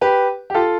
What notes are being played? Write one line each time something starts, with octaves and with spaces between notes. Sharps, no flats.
G4 B4
G4
F4 A4